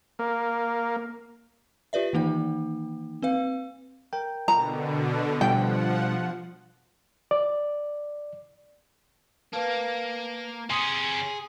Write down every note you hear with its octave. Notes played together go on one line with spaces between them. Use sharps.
A#3
F4 G4 B4 D5 E5
D#3 E3 A#3 D#4 G5
C4 B4 F5
A#4 G5
B2 D3 A#5
B2 F3 G3 D4 F#5 G5
D5
A#3 B4 F5 A5
C3 C#4 G#4 C6 D#6